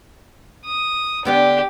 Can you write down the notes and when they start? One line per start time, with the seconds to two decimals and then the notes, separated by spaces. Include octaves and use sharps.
0.65 D#6
1.25 D3 B3 D4 G4